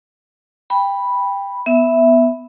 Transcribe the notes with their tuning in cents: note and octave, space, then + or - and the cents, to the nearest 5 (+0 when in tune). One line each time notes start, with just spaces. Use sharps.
G5 +20 B5 -5
B3 +0 E5 +0